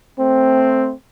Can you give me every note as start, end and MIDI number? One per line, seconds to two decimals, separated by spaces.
0.19 0.93 57
0.19 0.93 60